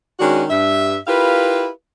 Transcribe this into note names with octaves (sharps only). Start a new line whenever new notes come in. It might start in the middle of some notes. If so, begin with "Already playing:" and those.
D#3 G#3 C#4 D4 F#4
G2 E5
E4 F4 G4 A#4 B4 F5